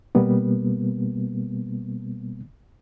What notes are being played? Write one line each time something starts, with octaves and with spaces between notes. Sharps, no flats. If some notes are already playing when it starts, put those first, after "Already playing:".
B2 G3 A#3 B3